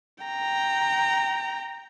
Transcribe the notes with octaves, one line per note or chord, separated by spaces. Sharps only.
G5 A#5